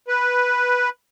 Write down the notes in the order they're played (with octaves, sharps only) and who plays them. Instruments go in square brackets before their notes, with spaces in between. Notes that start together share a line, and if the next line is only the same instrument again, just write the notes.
[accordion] B4